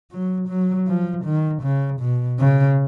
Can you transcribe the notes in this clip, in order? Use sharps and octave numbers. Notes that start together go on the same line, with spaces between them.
F#3
F#3
F3
D#3
C#3
B2
C#3